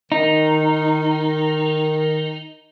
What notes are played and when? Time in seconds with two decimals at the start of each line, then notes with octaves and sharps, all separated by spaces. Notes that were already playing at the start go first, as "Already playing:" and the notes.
0.12 D#3 D#4